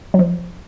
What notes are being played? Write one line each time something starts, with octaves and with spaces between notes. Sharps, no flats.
F#3
F3